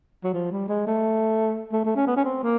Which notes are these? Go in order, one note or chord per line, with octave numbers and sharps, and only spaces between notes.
F#3
F3
G3
G#3
A3
A3
A3
C#4
B3
C#4
C4
A#3